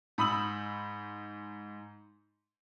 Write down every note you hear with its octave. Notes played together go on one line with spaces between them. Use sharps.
G#2 B5 D#6 E6 F#7